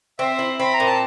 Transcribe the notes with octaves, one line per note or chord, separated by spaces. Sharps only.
C4 E5
E4
C4 B5
A#5
A#2
A5